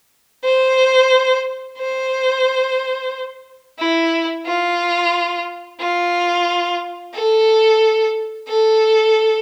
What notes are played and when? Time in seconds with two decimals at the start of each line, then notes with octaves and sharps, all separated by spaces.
0.44 C5
1.79 C5
3.79 E4
4.46 F4
5.80 F4
7.14 A4
8.48 A4